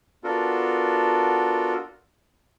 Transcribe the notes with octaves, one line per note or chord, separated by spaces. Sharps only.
B3 D4 F4 F#4 A4 A#4